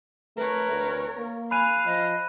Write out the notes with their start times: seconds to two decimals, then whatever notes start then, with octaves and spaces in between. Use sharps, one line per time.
0.37 A3 A#4 B4 C#5
0.72 D2
1.18 A#3
1.51 F5 G#5 B5 F#6 D#7
1.86 F3 D#5